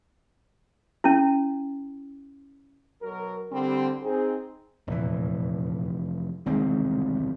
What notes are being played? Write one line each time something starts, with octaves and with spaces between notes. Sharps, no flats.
C#4 E4
B2 F#3 F#4 A#4
D3 G3 C4
C4 D#4 G#4
F1 E2 A#2 E3
E1 C2 D#3 G#3 C4